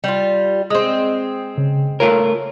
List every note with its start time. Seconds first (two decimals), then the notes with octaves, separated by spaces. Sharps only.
0.04 G3 F4
0.70 G#3 C4 D#6
1.58 C#3
2.00 A3 F4 A#4 C#5